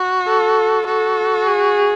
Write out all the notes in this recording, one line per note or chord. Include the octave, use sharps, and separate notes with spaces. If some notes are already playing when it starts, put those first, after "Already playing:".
Already playing: F#4
A4
F#4 A4
G#4